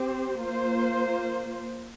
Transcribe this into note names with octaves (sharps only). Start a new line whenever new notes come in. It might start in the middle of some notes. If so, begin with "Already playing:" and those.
Already playing: C4 G4 C5
A#3 F4 C5